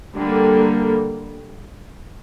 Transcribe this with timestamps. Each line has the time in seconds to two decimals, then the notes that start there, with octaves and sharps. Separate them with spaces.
0.14 D3 G3 A#3